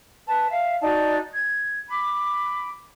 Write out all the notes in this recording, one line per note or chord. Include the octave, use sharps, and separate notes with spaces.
B4 A5
E5 F5
D#4 F#4 D5 A5
G#6
B5 D6